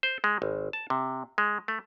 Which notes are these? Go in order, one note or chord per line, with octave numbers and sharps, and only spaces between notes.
C5
G#3
G#1
A5
C3
G#3
A3